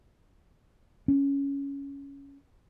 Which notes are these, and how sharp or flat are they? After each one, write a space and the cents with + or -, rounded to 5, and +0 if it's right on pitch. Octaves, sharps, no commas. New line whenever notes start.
C#4 +10